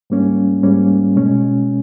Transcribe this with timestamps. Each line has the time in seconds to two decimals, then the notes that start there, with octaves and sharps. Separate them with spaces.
0.10 G#2 G3 A#3 C#4
0.63 G#2 G3 A#3 C#4
1.16 B2 G#3 C#4